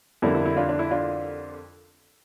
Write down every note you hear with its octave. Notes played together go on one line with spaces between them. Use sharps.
F2 D3 G3 A#3 E4
E4
E4
D4 F4
D4
E4
D4 F4